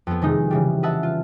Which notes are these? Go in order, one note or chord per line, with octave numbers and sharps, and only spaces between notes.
F2 B3
C3 D#3 G#3 D#4
C#3 E3 G3
B4 D#5 E5 F#5 A5
F4